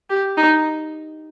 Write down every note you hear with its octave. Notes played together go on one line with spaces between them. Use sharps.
G4
D#4